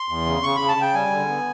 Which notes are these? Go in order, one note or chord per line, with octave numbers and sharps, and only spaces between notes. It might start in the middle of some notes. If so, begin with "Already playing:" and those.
Already playing: C6
E2
C#3
C#3 C#6
C#3 B5
A5
C#3 G5
G3 G#5
D3
B3